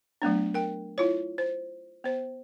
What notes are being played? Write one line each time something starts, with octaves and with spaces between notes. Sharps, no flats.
F#3 A3 B3 D4
A#4 G5
E4 F4 C#5
C5
B3 C5